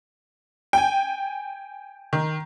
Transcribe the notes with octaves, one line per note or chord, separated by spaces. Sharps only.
G5 G#5
D#3